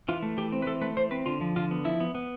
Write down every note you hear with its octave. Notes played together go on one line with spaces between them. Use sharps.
E3 F4
A3
E3 G4
C4
B4
E3 A4
A3 B4
E3 C5
C4 B4
D3 F4
F3
D3 F4
B3
F3 E4
B3
B3